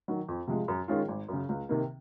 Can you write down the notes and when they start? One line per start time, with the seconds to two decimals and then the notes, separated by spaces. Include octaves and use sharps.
0.08 D#3 F#3
0.28 F2
0.47 C3 F3 G#3
0.68 F#2
0.88 D#3 G#3 C#4 F4
1.08 G#1
1.28 F#2 C#3
1.49 C#2
1.69 C3 D#3 A#3